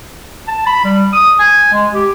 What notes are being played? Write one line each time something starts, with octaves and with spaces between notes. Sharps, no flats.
A5
B5
G3
D#6
G#5
G#3
G4